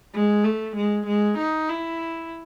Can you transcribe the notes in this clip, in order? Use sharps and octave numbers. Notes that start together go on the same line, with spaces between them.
G#3
A3
G#3
G#3
D#4
E4